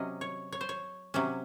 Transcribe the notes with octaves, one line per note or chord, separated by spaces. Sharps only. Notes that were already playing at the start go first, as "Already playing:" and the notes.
Already playing: C3 F#3 C#4 D#5
C#5
C#5
C5
C#5
C3 F#3 C#4